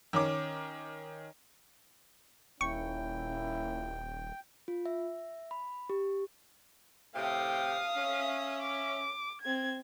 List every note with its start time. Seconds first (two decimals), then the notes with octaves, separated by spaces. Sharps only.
0.13 D#3 C#4 D6
2.61 D#1 A#3 C#4 E4 G5 C#6 C#7
4.68 F4
4.86 E5
5.51 B5
5.90 G4
7.15 A2 C3 F5 G5 D#6
7.96 C#4 E5
8.62 D6
9.41 C4 G#6